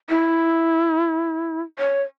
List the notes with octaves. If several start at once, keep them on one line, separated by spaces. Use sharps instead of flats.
E4
C#5